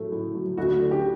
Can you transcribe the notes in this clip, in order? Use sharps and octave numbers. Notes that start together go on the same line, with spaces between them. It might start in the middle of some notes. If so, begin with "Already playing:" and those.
Already playing: A2 F#3 A3
A2
F#3
D2 F#4
D3
G4